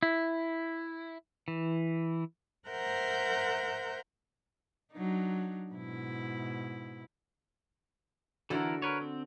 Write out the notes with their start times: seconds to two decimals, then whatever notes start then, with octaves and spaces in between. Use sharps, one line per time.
0.03 E4
1.48 E3
2.68 A#4 C5 E5 F#5 A#5 G6
4.92 F#3 D4 D#4
5.72 G#2 B2 E4
8.50 D3 E3 E4 F#4 A4 A#4
8.82 A#4 B4 C#5
9.01 C4